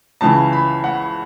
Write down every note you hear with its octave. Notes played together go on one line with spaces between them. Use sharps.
C#2 C#3 E3 A5
B5
F#5